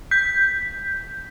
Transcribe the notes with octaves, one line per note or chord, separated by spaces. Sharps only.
G6 B6